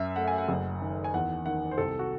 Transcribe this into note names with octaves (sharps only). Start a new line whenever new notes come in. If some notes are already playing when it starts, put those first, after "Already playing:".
Already playing: F#2 E5
A3 F#5
G#5
F#5
F#1
D#3
G#5
E2 F#5
D#3 F#5
C5
C2 A4
F#4